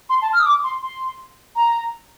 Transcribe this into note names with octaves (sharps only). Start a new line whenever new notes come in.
C6
A5
F6
D#6
D6
C6
C6
A#5